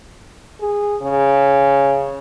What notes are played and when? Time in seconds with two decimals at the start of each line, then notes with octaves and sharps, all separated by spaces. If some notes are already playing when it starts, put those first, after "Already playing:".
0.61 G#4
1.02 C#3